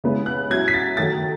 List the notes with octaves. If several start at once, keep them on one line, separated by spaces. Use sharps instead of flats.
C#3 G#3 B3 E4
F#6
F#3 C#4 E4 G#6
B6
A6
D#3 F#3 A3 A6